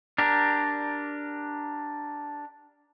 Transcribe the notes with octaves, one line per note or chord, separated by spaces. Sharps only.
D4 G4 A#4